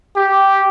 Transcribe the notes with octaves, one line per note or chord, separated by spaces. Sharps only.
G4